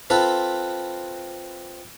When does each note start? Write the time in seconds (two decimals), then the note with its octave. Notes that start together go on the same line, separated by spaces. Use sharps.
0.10 C4 F4 A4 B4